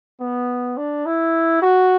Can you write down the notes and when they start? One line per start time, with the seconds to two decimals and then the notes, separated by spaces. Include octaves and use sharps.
0.21 B3
0.77 D4
1.06 E4
1.62 F#4